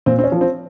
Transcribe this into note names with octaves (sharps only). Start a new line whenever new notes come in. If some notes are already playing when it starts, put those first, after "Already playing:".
A#2 C4
C4
C#4
F3
C4